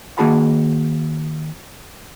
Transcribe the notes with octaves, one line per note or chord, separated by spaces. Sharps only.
D#3 A#3 F#4 G#4 A5 B5